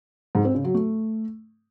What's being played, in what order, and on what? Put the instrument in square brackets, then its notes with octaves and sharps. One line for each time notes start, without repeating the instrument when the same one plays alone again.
[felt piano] G#2
C4
C#3
F#3
A3